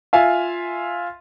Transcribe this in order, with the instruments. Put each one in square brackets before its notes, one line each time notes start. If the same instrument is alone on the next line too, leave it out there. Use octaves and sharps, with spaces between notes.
[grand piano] F4 E5 F5 G#5